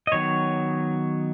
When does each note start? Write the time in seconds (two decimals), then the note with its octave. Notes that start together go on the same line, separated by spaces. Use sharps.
0.07 D#5
0.12 D#3 F#3 B3 C#5